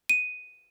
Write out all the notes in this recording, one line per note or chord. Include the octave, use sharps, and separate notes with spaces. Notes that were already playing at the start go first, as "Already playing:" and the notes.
D#7